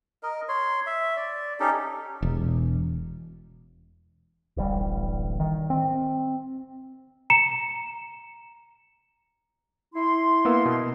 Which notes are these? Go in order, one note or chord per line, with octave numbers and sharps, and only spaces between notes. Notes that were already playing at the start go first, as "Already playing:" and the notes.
A#4 D#5
C#5 C6
E5
D5
C#4 D#4 G4 A4
E1
D1 A1 G3
D#3
C4
A#5 C#7 E7
E4 C6
A#3 B3 E6
B2